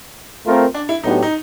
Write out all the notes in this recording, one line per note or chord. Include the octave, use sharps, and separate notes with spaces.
A3 C4 F4 A#4
D4
E4
A2 F#3 B3 D4 D#4 G4
D#4